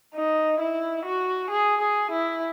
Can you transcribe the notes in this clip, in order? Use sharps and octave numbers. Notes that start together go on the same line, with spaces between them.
D#4
E4
F#4
G#4
G#4
E4